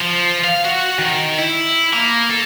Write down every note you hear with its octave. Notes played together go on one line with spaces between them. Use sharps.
F3
F5
F#4
D#3
E4
A#3
A4